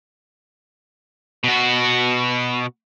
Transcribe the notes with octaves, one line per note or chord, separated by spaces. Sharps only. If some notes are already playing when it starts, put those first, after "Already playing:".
B2 F#4